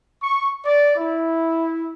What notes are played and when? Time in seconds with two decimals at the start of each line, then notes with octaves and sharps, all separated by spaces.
0.23 C#6
0.65 D5
0.97 E4